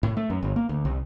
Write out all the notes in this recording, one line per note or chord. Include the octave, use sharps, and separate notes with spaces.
A2
A3
F#2
G1
A#3
D2
C2